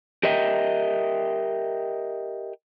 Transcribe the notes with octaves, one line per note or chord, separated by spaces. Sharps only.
G4 A#4 D#5 E5 G5